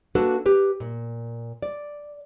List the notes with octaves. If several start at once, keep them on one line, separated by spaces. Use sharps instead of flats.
A#3 D4 F#4 A4 B4
G4 B4
A#2
D5